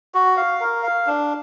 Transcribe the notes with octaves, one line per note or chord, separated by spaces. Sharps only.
F#4
F5
A#4
F5
D4